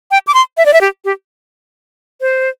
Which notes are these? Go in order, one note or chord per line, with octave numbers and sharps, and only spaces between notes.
G5
D6
C6
E5
D5
E5
G4
G4
C5